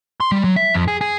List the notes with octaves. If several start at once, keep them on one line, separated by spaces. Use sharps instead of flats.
C6
G3
F#3
E5
F2
G#4
G#4